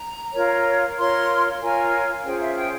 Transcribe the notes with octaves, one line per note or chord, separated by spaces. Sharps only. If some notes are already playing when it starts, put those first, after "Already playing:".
Already playing: A#5
F4 A#4 C#5
F4 A#4 C#5 C6
F4 A#4 C#5 G#5
C#4 F4 G#4 C5 G5
E5
G5